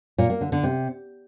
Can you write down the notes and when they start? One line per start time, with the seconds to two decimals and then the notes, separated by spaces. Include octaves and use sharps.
0.18 A#2
0.30 A#3
0.41 D3
0.52 D3
0.63 C3